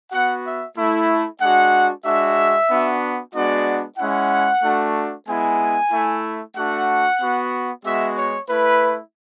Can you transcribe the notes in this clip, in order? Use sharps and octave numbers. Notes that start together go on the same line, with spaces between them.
B3 F#4 F#5
E5
A3 E4
G#3 D4 F#4 F#5
G#3 D4 F#4 E5
B3 D4 F#4
G#3 B3 D4 F#4 D5
G#3 C#4 E4 F#5
A3 D4 F#4
G#3 B3 E4 G#5
A3 E4
A3 D4 F#4 F#5
B3 F#4
G#3 B3 F#4 E5
C#5
A3 E4 B4